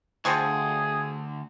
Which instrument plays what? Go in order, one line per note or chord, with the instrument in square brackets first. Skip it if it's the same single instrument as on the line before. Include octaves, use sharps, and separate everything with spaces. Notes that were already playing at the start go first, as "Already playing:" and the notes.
[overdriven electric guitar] D2 [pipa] F3 C4 C#6 [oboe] G#4